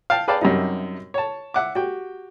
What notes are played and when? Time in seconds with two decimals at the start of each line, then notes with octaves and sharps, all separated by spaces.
0.10 F5 G5 A5
0.28 G#4 B4 D5 F5 G5 A5
0.41 F#2 C3 G3 D#4
1.14 C#5 A5
1.54 E5 F#5 D6
1.75 F#4 G4 G5